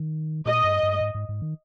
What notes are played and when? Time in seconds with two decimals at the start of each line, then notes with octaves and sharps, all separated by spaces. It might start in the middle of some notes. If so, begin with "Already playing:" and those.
Already playing: D#3
0.46 A#2 D#5
0.64 G2
0.83 G2
1.01 G#2
1.15 G#2
1.29 G#2
1.42 D#3